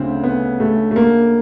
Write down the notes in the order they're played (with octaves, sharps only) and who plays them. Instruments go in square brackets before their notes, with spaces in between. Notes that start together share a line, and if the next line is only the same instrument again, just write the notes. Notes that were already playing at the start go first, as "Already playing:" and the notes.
Already playing: [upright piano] D2 C#3 [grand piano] C4
[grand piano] B3
A3
A3
A#3